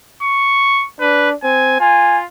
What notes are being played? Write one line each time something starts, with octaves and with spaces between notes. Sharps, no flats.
C#6
D4 B4
C4 G#5
F4 G#5